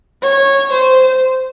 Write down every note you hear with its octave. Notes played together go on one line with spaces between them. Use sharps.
C#5
C5